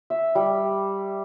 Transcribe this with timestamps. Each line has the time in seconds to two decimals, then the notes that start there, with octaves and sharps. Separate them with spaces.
0.10 E5
0.35 G3